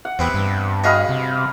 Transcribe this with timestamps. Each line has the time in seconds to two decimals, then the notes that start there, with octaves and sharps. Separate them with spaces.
0.05 F#5
0.19 E2 C3 B3 E4
0.34 G2
0.84 F#4 G#4 D#5 F5 B5
1.09 C3